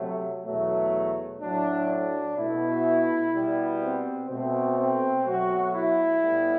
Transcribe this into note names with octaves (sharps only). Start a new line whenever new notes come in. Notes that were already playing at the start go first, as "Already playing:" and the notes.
Already playing: C3 F#3 A3
E2 B2 F#3 A3
A2 F#3 A3 D4
D4
B2 A3 E4
B2 G3 B3
C4
B2 A3 C4
C4
B2 F#3 A3 F#4
E4
A2 G3 B3